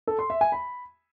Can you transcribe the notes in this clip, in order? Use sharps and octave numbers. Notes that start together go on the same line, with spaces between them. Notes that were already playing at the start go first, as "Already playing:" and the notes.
A4
C6
E5
G#5
B5